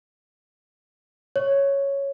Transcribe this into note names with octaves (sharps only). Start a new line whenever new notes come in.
C#5